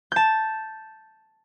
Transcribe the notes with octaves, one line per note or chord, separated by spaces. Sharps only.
A5 G6